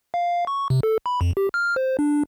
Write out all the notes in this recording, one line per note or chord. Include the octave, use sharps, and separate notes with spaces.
F5
C#6
C3
A4
B5
F2
G4
F6
C5
D4